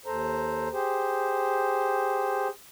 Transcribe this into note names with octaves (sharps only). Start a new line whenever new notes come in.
D#2 A4 C5 A#5
G4 G#4 C5